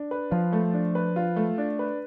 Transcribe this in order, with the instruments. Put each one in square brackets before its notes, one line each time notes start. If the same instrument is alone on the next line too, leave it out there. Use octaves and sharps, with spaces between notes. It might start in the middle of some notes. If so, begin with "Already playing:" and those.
Already playing: [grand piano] D4
B4
[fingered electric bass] F3 [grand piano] F4
[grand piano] A3
D4
B4
F4
A3
D4
B4